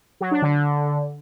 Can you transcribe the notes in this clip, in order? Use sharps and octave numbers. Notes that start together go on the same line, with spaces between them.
F#3
D4
D3